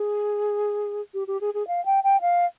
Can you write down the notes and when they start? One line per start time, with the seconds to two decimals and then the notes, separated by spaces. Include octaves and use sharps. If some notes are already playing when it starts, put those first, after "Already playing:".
Already playing: G#4
1.14 G4
1.27 G4
1.41 G#4
1.54 G#4
1.68 F5
1.85 G5
2.04 G5
2.21 F5